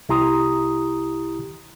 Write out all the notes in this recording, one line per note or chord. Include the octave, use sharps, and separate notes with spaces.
C2 E4 G4 A#5 C6 D#6